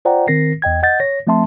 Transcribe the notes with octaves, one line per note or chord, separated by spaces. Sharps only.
F4 C5 D5 F#5 G5 A#5
D#3 C4 A#4 A#6 C7
E2 D#5 G5 G#6
D#5 F#5 G6 A6
C#5 A#6
F3 A3 C4 E5 A5 C6